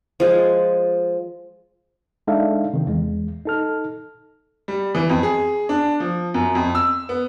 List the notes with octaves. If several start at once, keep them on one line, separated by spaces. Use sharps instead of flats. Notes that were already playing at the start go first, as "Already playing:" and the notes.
F3 G#3
G#3 D4 D#4 A4 E5 F5
C3 D#3
E2 G#3
D#4 A4 F6
G3
E3
F2
G#4
D4
F3
F#2
F2
E6
B3